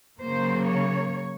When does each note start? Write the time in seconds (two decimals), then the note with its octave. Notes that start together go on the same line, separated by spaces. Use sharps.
0.20 C#3 F#3 A#3 C5
0.67 C#5